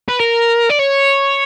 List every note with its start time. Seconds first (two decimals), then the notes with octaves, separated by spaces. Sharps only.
0.08 B4
0.19 A#4
0.69 D5
0.79 C#5